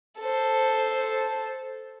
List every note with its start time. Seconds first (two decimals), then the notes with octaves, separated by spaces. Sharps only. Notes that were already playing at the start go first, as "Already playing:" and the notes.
0.19 A4 C5